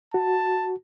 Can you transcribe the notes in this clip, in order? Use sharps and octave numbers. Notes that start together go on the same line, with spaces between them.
F#4 A5